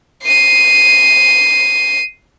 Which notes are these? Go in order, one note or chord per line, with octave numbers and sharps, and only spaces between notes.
C7 D#7